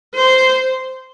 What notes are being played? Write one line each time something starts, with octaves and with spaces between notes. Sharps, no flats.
C5